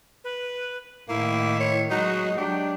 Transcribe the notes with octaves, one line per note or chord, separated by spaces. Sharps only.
B4
A2 D#3 A#3 E4
C#5
F#3 G#3 D#4 F#4
F#3 D4 G4